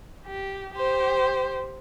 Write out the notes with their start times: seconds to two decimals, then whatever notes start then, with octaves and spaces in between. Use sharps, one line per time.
0.27 G4
0.73 G4 C5